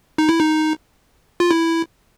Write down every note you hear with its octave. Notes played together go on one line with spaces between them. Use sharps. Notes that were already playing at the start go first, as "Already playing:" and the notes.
D#4
E4
D#4
F4
E4